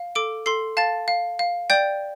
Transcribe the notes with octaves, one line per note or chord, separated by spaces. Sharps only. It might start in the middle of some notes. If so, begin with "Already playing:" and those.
Already playing: F5
A4 D6 D7
A4 C6 C7
F5 A5 A6
F5
F5
D5 G5 G6